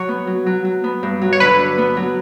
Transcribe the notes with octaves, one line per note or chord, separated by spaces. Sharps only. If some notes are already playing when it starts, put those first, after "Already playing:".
Already playing: F#3 C#5
B3
F#3
F#3
F#3
B3
G2
F#3
C#5
D3 B4
D4
B3
F#3